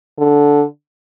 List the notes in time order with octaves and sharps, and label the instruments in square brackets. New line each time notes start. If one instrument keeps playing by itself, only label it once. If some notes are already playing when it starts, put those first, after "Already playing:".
[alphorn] D3